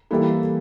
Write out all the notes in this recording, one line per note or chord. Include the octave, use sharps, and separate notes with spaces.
E3 G3 A#3 E4 A4